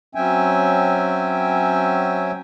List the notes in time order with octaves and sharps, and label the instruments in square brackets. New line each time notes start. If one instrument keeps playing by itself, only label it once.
[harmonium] F#3 C4 C#4 E5 G5 G#5